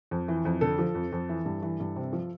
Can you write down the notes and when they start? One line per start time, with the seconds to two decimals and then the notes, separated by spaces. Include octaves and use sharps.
0.11 F2
0.28 E3
0.45 F2
0.61 D3 A4
0.79 F3
0.95 F2
1.12 F2
1.29 E3
1.45 G2
1.62 E3
1.80 G2
1.96 C3
2.13 F3